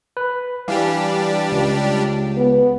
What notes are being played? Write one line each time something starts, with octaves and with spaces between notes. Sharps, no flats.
B4
E3 G3 D4 G4 F5
C#2
B3